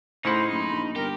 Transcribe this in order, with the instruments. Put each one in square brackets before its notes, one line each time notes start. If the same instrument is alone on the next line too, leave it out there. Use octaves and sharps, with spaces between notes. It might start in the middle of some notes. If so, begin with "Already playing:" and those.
[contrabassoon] A2 [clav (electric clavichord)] C#3 E4 F#5 [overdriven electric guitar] D#4 [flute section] C5 B5
[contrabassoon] F#1 [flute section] B5 C6
[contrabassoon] A#1
[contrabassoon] G1 [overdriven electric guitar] G4 [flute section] A#4